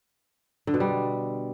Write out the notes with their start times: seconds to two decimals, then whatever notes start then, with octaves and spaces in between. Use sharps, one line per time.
0.67 D3
0.74 B2
0.80 G3